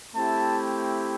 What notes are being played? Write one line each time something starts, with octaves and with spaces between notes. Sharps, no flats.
A3 C4 E4 G4 A5